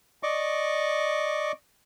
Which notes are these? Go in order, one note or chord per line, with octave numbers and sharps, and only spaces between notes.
D5 D#5 C#6 D6